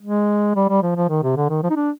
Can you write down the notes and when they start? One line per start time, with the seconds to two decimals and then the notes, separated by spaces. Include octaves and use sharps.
0.02 G#3
0.56 G3
0.69 G3
0.83 F3
0.96 F3
1.09 D#3
1.23 C3
1.36 D3
1.49 D#3
1.63 F3
1.70 D#4
1.76 D4